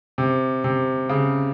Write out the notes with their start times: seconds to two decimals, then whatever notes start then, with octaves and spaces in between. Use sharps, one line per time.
0.18 C3
0.64 C3
1.09 C#3